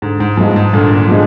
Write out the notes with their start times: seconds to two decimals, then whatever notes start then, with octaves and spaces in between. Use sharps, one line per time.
0.02 G#2 D3
0.20 G#2
0.37 G2 F3 G#3
0.56 G#2
0.73 A#2 D3
0.96 D3
1.08 F3 G#3